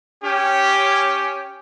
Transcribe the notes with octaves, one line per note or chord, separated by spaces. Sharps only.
C#4 G4